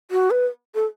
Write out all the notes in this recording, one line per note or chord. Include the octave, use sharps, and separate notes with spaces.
F#4
B4
A4